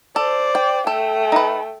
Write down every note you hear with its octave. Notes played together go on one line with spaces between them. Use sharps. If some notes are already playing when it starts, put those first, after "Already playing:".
A4 C5 D5
G5
A3 A4 G5
D#4 B4